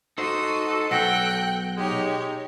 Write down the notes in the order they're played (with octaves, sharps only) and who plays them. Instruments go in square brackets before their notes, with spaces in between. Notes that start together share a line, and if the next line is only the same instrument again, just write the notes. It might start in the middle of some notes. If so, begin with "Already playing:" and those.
[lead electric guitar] D#4 C5 [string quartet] F#4 D#6 [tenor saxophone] A4
[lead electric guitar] B1 [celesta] F#5 A#6 D7 [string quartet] G5 F#6 G6
[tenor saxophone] G#3 [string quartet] D#4 G4 C#5